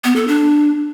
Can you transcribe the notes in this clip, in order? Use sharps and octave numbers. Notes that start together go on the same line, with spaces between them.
B3
A4
D4